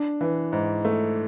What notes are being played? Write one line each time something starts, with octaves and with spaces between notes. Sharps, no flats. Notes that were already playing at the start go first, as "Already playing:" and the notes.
Already playing: D4
E3
G#2
A3